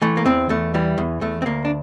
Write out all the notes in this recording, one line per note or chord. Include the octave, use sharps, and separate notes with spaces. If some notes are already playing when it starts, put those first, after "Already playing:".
E3 A3
A#3
E2 C4
E2 A3
E3 G3
E2
E2 A3
C4
D2 A#3
D4